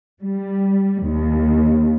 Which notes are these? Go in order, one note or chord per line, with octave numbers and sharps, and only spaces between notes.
G3
D#2